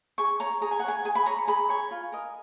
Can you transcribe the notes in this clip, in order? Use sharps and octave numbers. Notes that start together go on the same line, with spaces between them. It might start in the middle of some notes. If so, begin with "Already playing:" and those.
G#4 C#6
C#5 A#5
G#4 A#5
G#5
F#5
C#5 G#5
G#4 G#5
B5
C#5 A#5
G#4 B5
C#5 G#5
F4
A#4 D#5